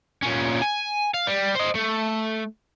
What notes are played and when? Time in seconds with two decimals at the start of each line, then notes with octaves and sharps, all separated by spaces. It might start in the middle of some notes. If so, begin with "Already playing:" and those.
0.23 A#2 C#4
0.62 G#5
1.14 F5
1.27 G3
1.55 C5 D#5
1.75 A3